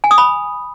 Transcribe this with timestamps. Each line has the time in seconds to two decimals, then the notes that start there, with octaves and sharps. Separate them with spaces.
0.04 G#5
0.11 D#6
0.18 B5